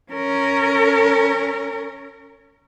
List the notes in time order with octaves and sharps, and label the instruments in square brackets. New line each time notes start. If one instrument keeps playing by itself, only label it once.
[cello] C#4 A#4